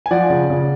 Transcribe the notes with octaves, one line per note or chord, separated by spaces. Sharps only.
G#5
F3 D5 F#5
C#3
C#3